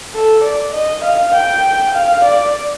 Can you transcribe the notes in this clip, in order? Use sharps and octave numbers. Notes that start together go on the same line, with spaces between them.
A4
D5
D#5
F5
G5
F5
D5